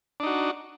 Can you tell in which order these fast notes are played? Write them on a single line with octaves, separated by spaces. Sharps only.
D4 D#4 F#4